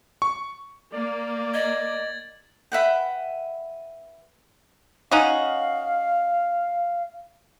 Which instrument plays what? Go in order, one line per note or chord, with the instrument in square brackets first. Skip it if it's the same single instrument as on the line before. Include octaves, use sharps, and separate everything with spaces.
[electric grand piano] C#6
[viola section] A#3 [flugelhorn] D5
[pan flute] D#5 [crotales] G#6 A6 F#7
[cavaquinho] B4 E5 F#5 G5
[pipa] C#4 D#4 F#4 [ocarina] F5